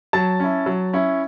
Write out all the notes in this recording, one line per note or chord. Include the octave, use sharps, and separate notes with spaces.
F#3 A5 A6
C#4 E4
F#3
C#4 E4